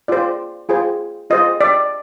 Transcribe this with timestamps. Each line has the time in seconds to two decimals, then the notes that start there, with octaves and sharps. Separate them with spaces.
0.08 F4 G#4 C5 D5
0.69 F4 G#4 C5
1.30 F4 G#4 C5 D#5
1.61 D5